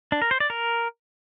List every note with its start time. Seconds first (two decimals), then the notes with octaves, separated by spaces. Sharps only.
0.12 D4
0.22 A#4
0.31 C5
0.40 D5
0.50 A#4